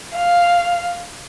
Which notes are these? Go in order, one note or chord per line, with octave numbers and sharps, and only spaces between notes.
F5